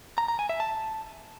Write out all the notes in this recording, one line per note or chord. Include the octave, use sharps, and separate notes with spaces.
A#5
A#5
G#5
E5
A5